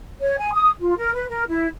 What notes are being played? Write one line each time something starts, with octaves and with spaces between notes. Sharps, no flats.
C#5
G#5
D#6
F4
A#4
B4
A#4
E4